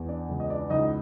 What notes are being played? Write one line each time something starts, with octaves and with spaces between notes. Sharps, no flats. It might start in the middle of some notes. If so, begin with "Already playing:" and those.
Already playing: E2
D4 D5
C#2
D#5
D4 D5
C#2 D#4 D#5